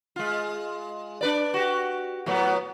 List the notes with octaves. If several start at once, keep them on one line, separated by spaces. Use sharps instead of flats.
G#3 F4
D4 B4 D5
F#4 G4
A2 F#3 B3